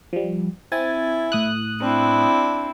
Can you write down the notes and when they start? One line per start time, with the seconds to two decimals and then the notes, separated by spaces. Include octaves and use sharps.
0.13 F3 G3
0.72 C4 E4 G#5 A6
1.32 A2 D#6 F#6
1.81 C4 D4 E4